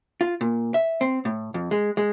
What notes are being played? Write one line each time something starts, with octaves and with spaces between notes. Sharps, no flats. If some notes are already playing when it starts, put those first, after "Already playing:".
F4
A#2
E5
C4
A2
F2
G#3
G#3